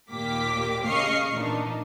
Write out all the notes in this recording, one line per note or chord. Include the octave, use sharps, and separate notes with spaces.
D#2 A#2 A#3 G4 D6 B6
C#3 D#5 F5 C#6 F6 C7
A#2 E3 D4 D#4